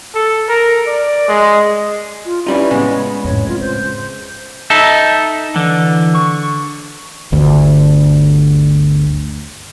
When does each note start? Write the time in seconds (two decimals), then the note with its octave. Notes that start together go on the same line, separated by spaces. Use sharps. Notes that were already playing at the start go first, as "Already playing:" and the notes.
0.15 A4
0.48 A#4
0.87 D5
1.28 G#3
2.25 F4
2.47 E3 G3 C#4 D#4
2.71 A2 C#3 G#3 B3
3.24 F2 A2 C#5
3.48 C4 F4
3.60 C5
4.70 D#4 A4 E5
5.56 D3 E3
6.14 C#6
7.32 G1 D2